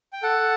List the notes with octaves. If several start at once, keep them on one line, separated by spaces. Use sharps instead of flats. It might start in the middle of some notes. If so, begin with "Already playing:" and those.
G5
A4 F#5